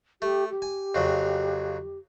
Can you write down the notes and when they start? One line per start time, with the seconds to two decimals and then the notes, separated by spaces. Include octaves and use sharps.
0.22 A3 G4
0.50 G4
0.62 G#5
0.95 F2 C#3 F#3